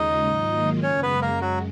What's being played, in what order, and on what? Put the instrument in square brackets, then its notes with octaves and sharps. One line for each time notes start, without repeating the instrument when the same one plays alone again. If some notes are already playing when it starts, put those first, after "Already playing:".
Already playing: [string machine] D#2 C#3 G#3 C#4 F4 [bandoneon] D#4 D#5
[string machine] G#2 D#3 F#3 A#3 F4
[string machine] F#2 C#3 G#3 [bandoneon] C#4 C#5
[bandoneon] B3 B4
A#3 A#4
F#3 F#4